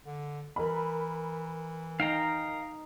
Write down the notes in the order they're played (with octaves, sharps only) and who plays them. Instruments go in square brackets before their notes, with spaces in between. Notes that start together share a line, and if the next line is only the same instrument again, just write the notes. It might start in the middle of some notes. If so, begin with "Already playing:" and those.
[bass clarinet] D3
[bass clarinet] E3 [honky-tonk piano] A#4 B5
[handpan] D#4 [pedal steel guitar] F5 G5 A#5